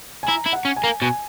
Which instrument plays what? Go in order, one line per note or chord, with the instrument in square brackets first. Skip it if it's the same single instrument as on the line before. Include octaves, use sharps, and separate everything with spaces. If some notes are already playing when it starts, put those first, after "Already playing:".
[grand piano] G#5
[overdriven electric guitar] E4 [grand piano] A#5
[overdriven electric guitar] E4
[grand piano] F#5
[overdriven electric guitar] C#4
[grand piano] G#5
[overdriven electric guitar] A#3
[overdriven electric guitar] B2 [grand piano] G#5